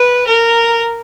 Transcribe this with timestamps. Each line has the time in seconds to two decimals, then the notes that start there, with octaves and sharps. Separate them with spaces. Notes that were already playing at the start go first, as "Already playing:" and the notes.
Already playing: B4
0.27 A#4